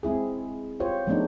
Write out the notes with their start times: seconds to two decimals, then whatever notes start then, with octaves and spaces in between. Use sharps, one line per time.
0.03 G#3 C4 E4 G#4
0.80 F4 G4 C5 C#5
1.07 F3 G#3 A3 B3 D4 D#4